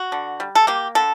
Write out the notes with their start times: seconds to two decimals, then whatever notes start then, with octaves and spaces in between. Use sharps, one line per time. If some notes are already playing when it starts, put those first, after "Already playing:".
Already playing: F#4
0.12 D3
0.40 G3
0.55 A4
0.67 A#3 G4
0.95 D3 A4